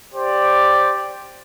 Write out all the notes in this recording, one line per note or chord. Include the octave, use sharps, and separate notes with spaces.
G4 C5 D5